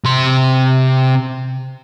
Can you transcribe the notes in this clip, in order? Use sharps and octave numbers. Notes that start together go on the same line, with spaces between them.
C3 C6